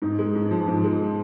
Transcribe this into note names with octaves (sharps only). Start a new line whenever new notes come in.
G#2 D#4
G#3
G#2
F3
G#2
G#3